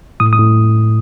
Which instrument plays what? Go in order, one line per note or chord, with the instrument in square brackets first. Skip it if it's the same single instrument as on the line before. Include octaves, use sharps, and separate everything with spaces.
[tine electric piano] A2 D#6
D#6
A2